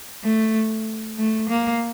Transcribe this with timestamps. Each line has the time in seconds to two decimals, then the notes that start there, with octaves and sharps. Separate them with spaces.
0.24 A3
1.18 A3
1.49 A#3